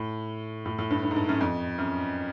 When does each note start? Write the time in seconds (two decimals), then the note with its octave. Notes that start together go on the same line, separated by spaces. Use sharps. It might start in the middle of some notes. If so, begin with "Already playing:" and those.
Already playing: A2
0.66 A2
0.79 A2
0.91 G2
1.03 G2
1.11 G#2
1.16 G2
1.29 F#2
1.41 F2
1.78 F#2